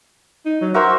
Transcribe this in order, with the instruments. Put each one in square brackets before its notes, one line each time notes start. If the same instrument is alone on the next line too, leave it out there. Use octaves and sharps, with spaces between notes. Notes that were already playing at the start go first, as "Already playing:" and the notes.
[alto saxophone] D#4
F#3
[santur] F#4 A#4 C5 [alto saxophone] E5